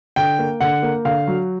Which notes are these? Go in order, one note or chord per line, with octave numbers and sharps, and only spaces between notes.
D3 G5
A#3
D3 F#5
A#3
D3 F5
F#3